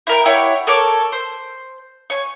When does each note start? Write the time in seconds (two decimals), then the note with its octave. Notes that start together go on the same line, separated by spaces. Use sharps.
0.07 E4 A#4 G5
0.26 E4 G4 C#5 F#5
0.67 A4 A#4 C#5 D6
1.12 C5
2.10 C#5 G#5